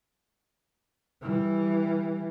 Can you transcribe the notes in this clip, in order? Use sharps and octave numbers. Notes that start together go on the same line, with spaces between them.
E3 G3